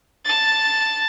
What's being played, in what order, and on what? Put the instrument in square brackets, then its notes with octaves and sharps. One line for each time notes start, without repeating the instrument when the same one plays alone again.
[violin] A5 A6